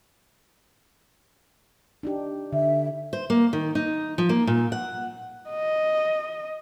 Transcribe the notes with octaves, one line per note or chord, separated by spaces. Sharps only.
D4 D#4 G4
D3 E5
C5
A#3
D#3
D#4
F3
A#3
A#2
F#5
D#5